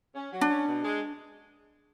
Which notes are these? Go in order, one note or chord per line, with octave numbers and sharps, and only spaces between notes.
C#4
F#3
D4
C#4
B2
G#3